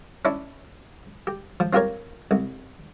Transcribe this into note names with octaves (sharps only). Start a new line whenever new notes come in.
C#4 D4 E4
G4
F3
C4 F4 G4 A#4 C#5
C2